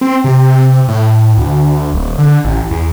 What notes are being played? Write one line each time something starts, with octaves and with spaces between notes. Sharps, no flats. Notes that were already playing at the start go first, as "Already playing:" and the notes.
C4
C3
A2
D2
D#1
D3
A1
E2